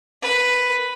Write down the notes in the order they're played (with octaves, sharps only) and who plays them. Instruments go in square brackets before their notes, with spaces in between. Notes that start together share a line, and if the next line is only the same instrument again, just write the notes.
[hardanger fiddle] B4